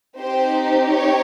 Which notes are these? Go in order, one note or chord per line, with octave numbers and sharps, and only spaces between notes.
C4 D#4 G4 C5
C#5